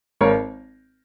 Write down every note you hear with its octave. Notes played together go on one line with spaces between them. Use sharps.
G#1 A#4 C#5